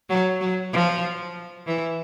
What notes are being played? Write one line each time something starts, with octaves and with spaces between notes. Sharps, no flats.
F#3
F#3
F3
E3